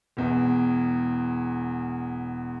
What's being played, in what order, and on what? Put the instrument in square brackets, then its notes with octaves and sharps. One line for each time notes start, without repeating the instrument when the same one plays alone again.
[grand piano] E1 E2